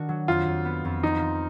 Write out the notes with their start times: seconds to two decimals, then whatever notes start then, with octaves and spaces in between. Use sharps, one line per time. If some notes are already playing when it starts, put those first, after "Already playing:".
Already playing: D#3 D4 F#4
0.09 F#3
0.28 F2 F4
0.47 F2
0.65 B3
0.85 F2
1.03 F3 D#4
1.21 F3